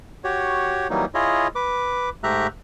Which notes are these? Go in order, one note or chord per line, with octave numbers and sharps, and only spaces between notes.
F#4 G4 C#5
E3 F#3 G3 A#3 D#4
E4 F4 G#4 C#5 D#5
B4 D6
G#2 A3 G4 E5 A#5 F#6